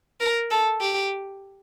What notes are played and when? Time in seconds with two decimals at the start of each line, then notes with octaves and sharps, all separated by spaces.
0.21 A#4
0.51 A4
0.81 G4